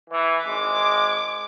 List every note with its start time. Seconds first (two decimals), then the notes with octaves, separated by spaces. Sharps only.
0.10 E3
0.45 G#1 G#3 D6